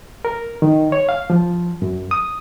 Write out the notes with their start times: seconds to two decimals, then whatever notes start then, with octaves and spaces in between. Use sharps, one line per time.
0.25 A#4
0.62 D#3
0.92 C#5
1.09 F5
1.30 F3
1.82 F#2
2.11 D#6